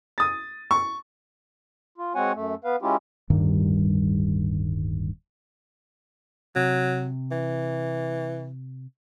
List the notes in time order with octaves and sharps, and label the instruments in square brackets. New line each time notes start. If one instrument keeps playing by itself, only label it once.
[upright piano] D#6 A6
C#6
[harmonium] F4
G#3 C4 F#4 C#5 F#5 G#5
F#2 A3
B3 B4 F5
G#3 C#4 E4 F4 G4
[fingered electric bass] D1 G2 D#3 G3
[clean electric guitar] C3 [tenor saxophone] F#3
[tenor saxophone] E3